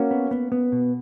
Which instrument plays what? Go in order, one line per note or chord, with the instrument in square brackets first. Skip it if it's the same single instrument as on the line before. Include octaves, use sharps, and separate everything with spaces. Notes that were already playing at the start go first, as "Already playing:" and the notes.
Already playing: [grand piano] A#3 C#4 [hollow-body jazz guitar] F#4
[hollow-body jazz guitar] B3
B3
B3
B2